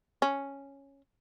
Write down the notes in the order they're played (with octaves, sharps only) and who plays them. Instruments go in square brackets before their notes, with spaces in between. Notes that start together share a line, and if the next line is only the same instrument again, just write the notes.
[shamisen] C#4